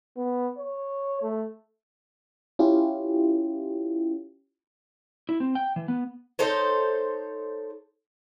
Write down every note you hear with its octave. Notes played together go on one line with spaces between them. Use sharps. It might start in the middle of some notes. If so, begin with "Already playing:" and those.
B3
C#5
A3
C#4 E4 F4 G4
E4
C4
G5
E3
B3
D#4 A4 C5 C#5